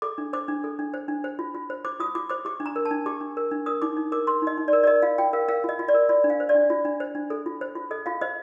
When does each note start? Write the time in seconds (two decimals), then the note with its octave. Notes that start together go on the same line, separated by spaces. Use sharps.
0.02 A4 D6
0.18 D4
0.33 C5 D6
0.48 D4
0.64 A4
0.79 D4
0.94 C5
1.08 D4
1.24 C5
1.39 F4
1.55 F4
1.70 C5
1.85 C5 D6
2.00 F4 D#6
2.15 F4 D6
2.29 C5 D6
2.45 G4 D6
2.60 D4
2.66 A#5
2.76 A#4
2.85 A5
2.91 D4
3.06 G4 D6
3.21 D4
3.37 A#4
3.51 D4
3.66 A#4 D#6
3.82 D#4 D6
3.97 D#4
4.12 A#4 D6
4.27 A#4 C6
4.42 D#4
4.47 D#5
4.58 D#4
4.68 D5
4.73 A#4
4.83 D5
4.87 A#4 D#5
5.02 F4 F5
5.18 F4 G5
5.33 A#4 F5
5.48 A#4 F5
5.64 F4 D#5
5.79 F4
5.88 D5
5.94 A#4
6.09 F4 D5
6.24 D4
6.30 F5
6.40 C5
6.49 D5
6.55 D4
6.70 F4
6.85 D4
7.00 C5
7.15 D4
7.30 A4
7.46 F4
7.61 C5
7.75 F4
7.91 A4 D#5
8.06 F4 F5
8.21 C5 D#5